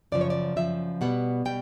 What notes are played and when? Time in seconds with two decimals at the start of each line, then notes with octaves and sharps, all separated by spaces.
0.12 F#2 C#3 F3 D5
0.21 C#5
0.30 D5
0.56 F#2 C#3 F3 E5
1.01 B2 G3 B3 F#5
1.45 B2 G3 G5